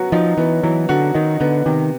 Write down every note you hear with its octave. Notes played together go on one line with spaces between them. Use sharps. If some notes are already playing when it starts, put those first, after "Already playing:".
Already playing: F#3 B3 F#4
F3 D#4
E3 B3
E3 F#3
D3 F#4
D#3 D#4
D3 B3
C3 D#3